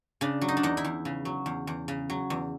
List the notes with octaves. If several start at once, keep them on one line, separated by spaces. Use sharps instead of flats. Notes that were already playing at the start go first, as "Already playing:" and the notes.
C#3 D4
F#3
D#4
D4
E2 D#4
E4
E2
C#3
F#3
E2
E2
C#3
F#3
E2